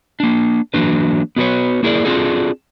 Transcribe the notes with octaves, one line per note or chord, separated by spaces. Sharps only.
A#3 D4
E3 F#3 A#3 D4 B4
B3 F#4 G#4 B4 C#5
A#3 E4 G#4 A#4 D5
C4 D4 F4 F#4 G#4 A4